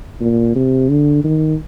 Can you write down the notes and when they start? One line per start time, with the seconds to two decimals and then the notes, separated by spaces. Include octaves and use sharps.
0.21 A#2
0.56 C3
0.90 D3
1.24 D#3